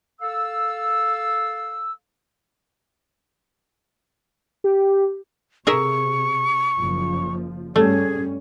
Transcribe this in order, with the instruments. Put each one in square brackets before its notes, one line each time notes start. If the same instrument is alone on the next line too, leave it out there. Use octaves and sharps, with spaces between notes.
[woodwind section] A4 F5 E6
[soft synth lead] G4
[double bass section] C3 [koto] G#4 A#4 E5 [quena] C#6
[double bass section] F#1 F3
[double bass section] G2 G3 C#4 [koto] A3 [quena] G#4